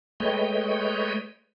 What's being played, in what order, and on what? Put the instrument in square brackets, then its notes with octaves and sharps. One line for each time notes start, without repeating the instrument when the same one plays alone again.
[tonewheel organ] G#3 A3 B4 C#5 D#5 G5